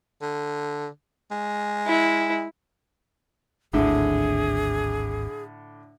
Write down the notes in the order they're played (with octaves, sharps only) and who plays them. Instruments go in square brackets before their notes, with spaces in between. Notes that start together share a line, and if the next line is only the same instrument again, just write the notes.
[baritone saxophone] D3
G#3
[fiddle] E4
[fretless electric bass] G#1 D2 [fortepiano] A2 D3 [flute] G#4